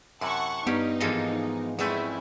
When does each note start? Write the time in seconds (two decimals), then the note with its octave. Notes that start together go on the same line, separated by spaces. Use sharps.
0.21 F#2 C3 E4 F#5 A5 C#6
0.67 G2 B3 C#4 D#4 G4
1.00 G#2 E3 F3 A#3 A4 D#5
1.79 E2 G#3 A3 C4 C#4 E4